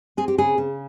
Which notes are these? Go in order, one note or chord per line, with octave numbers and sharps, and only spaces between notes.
C4 G#4
G4
C#3 G#4
C#3